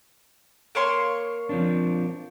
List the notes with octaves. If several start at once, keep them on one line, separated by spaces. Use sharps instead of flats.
A#3 C#5 C6
F3 C4 D4